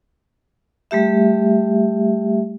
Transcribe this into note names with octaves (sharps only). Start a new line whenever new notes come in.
G3 A3 G4 E5